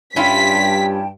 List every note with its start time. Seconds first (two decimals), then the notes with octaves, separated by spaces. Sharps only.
0.16 G2 G3 C#4 E4 F4 G5 A5 B6